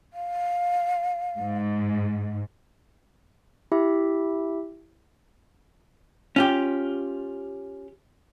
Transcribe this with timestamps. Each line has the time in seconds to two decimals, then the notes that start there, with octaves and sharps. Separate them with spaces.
0.13 F5
1.39 G#2
3.72 E4 G4 E5
6.36 C#4 F4 G4